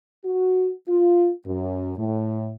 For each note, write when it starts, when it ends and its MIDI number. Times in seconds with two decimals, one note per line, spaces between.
0.25 0.72 66
0.89 1.30 65
1.46 1.93 42
1.98 2.53 45